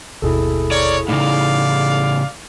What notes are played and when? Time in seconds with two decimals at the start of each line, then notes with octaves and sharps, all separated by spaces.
0.22 G1 D#2 B2 E4 G#4 A4
0.71 A#4 C#5 D5
1.09 A2 C#3 D#4 D5 F5